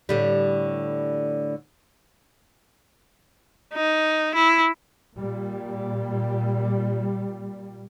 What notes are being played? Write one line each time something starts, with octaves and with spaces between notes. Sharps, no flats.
A2 D3 G3
D#4
E4
A#2 G3